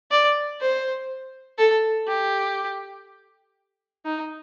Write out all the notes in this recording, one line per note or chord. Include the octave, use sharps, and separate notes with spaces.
D5
C5
A4
G4
D#4